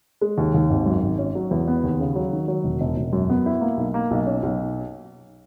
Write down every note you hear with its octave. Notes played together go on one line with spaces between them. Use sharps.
G#3
D#2
D#2
G#1
F#2
G#1
C#4
F#3
E2
B3
D#2
C#3
F#3
D#3
F#3
E1
E1
E1
F#2
B3
E4
A#3
B1
A#3
B1
C#4
B1